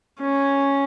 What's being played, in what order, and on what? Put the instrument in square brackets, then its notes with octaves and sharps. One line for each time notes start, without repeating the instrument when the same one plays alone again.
[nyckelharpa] C#4